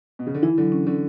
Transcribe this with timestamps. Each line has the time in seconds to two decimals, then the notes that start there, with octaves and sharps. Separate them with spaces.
0.19 B2
0.27 C#3
0.34 D3
0.42 E3 E4
0.58 D3 F#3
0.72 C#4
0.87 D3 C#4